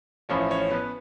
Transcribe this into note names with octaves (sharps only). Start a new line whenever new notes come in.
A1 A2 F3 C#4 C#5
C#4 C#5
B3 B4